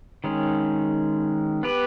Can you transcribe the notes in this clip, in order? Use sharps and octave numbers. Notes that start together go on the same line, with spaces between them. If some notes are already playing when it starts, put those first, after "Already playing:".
D#3 G#3 C#4
B3 G4 B4